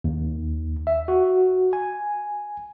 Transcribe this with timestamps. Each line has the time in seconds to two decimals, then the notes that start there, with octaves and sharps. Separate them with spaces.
0.04 D#2
0.87 E5
1.08 F#4
1.73 G#5